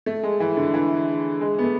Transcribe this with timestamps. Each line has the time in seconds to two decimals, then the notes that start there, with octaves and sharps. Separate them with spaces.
0.06 A3
0.23 G#3
0.40 E3
0.57 D3
0.74 E3
1.41 G#3
1.58 B3
1.64 A3